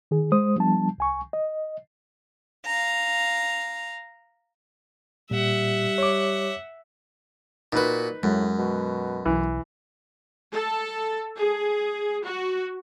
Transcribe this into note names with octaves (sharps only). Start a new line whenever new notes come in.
D#3 G#4
G#3 C5 D#6
F3 G3 B3 D4 A5
C2 G#5 C#6
D#5
F5 A#5
A#2 G3 E5 F#5
C#5 D6
A#2 D#4 F#4 B4
F#2 A2 G#3
B2
B1 E3
A4
G#4
F#4